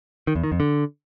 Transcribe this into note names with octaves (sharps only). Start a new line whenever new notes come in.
D#3
E2
D#3
F2
D3